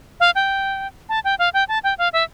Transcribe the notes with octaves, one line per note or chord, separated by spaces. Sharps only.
F5
G5
A5
G5
F5
G5
A5
G5
F5
E5